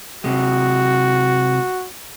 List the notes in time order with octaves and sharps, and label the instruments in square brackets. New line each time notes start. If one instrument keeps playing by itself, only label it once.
[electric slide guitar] C3 G#3 [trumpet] F#4